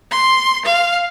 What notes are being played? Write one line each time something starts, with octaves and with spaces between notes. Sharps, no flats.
C6
F5